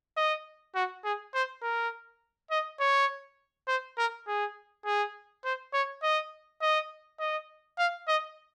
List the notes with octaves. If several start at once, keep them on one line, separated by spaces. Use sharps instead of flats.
D#5
F#4
G#4
C5
A#4
D#5
C#5
C5
A#4
G#4
G#4
C5
C#5
D#5
D#5
D#5
F5
D#5